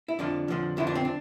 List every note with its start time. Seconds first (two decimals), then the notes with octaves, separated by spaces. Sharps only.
0.08 E4
0.19 F2 D3 F3 D4
0.48 F2 D3 F3
0.77 F2 D3 F3 E4
0.87 D4
0.95 C4
1.05 D4